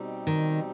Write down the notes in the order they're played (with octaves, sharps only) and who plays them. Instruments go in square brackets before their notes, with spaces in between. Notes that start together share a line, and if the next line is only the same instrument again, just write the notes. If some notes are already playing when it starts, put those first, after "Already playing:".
Already playing: [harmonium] B2 G3 C4 D#4 G4
[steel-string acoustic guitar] D#3